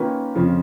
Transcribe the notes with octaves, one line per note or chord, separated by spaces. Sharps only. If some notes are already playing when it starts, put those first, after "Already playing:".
Already playing: D#3 A#3 C#4 F4 B4
F2 C#3 F3